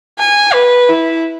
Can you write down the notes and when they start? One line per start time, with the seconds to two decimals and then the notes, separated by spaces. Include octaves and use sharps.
0.19 G#5
0.53 B4
0.89 E4